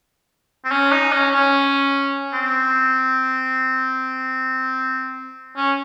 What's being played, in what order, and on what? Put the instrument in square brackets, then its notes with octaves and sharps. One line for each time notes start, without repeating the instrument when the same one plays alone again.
[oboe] C4
C#4
D#4
C#4
C#4
C4
C#4